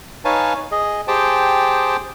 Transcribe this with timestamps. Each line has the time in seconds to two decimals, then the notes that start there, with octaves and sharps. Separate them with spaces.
0.25 D#4 B4 C#5 F5 G#5 A5
0.72 G#4 D#5
1.08 G4 G#4 C5 G5 A5